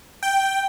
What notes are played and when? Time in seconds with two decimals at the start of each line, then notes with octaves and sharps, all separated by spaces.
0.23 G5